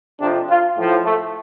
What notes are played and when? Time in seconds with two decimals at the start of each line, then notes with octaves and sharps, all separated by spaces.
0.20 F2 C3 F3 D4
0.49 F4
0.76 A2 F3
1.04 A3